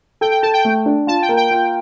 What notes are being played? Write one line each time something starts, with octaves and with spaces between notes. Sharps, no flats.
A4 G5
G5
A4 A5
G5
A3
D4
F4 A5
G5
A#3
G5
F4